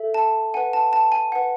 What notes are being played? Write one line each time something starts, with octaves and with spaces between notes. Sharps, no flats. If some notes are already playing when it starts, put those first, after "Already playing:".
Already playing: A4 E5
A5
B4 F#5 G#5
A5
A5
G#5
B4 F#5